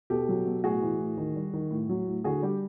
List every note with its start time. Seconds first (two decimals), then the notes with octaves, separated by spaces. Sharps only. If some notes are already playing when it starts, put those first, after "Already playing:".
0.10 B2 G4 A4
0.29 F#3
0.46 B2
0.64 A2 F#4 G#4
0.82 E3
1.00 A2
1.17 D#3
1.36 G3
1.54 D#3
1.71 A2
1.89 F#3
2.07 A2
2.24 D3 F#4 G#4
2.42 G3 G4